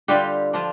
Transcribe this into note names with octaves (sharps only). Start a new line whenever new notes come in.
D3 G3 F4 G4
F3 D4 F4